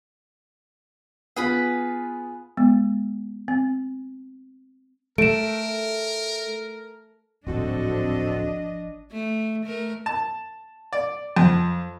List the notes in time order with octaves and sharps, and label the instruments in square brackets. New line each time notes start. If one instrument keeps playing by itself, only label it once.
[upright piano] B3 F4 [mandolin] G#4 B4 B5
[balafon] G#3 B3
C4
[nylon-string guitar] A3 [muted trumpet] A#4 [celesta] D7 E7
[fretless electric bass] D1 [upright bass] G#1 F3 [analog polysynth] C4 F#4 A4 [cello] D4 D#5
[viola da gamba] A3
A3 A#4
[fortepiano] A5
D5
F2